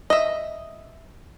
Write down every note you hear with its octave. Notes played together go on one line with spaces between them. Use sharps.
D#5 E5